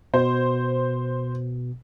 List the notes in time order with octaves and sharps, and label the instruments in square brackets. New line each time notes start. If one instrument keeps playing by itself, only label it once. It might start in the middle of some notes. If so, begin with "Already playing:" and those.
[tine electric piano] B2 [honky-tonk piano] C5